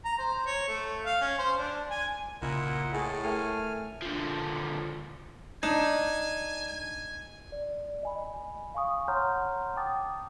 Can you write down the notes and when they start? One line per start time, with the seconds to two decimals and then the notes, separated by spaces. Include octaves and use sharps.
0.05 A#5
0.18 C5
0.46 C#5
0.68 A3
1.04 F5
1.21 C#4
1.38 C5
1.57 D4
1.90 G#5
2.42 B1 A#2 C#3 E4 D#5 F#5
2.93 A2 G#4 F#5
3.24 A3 A#4 G5 G#5 F6
4.02 D3 F3
5.63 D4 D#4 G#5
6.68 G#5
7.52 D5
8.03 D#5 G#5 B5
8.74 F5 G#5 C#6 D#6
9.08 C#5 F#5 A#5 C6 F6 G6
9.76 G5 A5 D6 D#6 A6